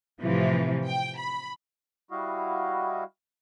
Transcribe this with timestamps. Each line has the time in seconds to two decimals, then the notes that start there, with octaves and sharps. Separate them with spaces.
0.22 A2 C3 E3 F3
0.85 G5
1.18 B5
2.11 G3 E4 F#4 D#5 F5